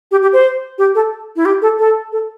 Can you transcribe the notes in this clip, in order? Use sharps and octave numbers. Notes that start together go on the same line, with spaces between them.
G4
G4
C5
G4
A4
E4
G4
A4
A4
A4